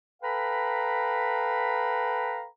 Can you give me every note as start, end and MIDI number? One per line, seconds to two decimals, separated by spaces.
0.23 2.45 69
0.23 2.45 71
0.23 2.45 77
0.23 2.45 79
0.23 2.45 82
0.23 2.45 83